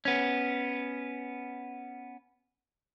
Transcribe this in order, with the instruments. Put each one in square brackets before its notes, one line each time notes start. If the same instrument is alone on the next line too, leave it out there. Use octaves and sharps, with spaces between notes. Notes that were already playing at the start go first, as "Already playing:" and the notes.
[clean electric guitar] B3 C#4